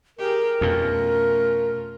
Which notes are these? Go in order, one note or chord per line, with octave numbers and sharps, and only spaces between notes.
G4 G#4 A#4
F2 B2 A3 C#4 F4